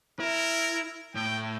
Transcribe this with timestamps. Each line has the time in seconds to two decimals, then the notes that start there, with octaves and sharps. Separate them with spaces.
0.20 E4 A#4
1.15 A2 G5